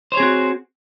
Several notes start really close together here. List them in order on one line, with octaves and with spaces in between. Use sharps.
C5 C#5 G#4 C4 F#4